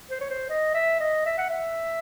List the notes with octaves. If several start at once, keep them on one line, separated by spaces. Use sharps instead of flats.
C5
C#5
C5
D#5
E5
D#5
E5
F#5
E5